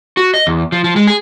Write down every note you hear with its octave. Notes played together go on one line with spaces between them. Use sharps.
F#4
D#5
E2
F3
F3
G#3
G#4